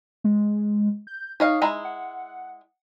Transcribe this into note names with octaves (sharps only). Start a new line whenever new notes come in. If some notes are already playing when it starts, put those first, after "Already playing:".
G#3
G6
D#4 C#5 D#5 F5
G#3 E4 A#5
F#5